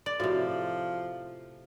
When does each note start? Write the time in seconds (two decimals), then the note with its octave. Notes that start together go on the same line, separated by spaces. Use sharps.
0.06 D5
0.20 A2 C3 F3 F#4